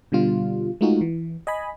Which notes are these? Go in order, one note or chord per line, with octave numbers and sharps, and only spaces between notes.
B2 D3 G3 F4
G#3 A3 D#4 F4 F#4 G#4
E3
D#5 G#5 B5